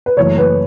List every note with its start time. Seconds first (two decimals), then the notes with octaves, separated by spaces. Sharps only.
0.06 B4
0.17 F#1 F#2 E3 A3 C#5
0.38 B4